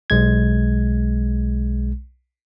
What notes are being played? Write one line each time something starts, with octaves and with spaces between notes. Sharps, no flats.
B1 G#3 G#6